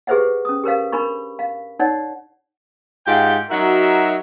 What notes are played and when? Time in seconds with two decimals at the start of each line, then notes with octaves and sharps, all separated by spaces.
0.07 G4 G#4 B4 C5 E5 F#5
0.45 C#4 D#6
0.64 G4 A#4 C5 F5
0.92 D4 A#4 B5 C#6
1.39 F5
1.79 D#4 C#5 D5 F#5
3.07 G#2 F4 G4 G5
3.50 F#3 D#4 F#4 A#4 E5